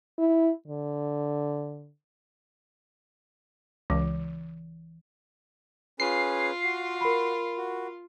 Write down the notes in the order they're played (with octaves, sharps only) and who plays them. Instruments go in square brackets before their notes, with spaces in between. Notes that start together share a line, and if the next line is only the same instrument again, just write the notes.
[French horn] E4
D3
[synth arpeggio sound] C#2 [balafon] E3
[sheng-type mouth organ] C#4 G#4 B4 [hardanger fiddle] F4 [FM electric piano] C7
[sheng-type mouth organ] F#4
[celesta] A#4 B5
[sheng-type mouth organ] F#4